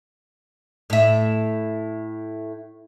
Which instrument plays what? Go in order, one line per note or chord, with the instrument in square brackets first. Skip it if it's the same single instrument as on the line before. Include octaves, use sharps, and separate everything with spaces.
[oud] A2 E5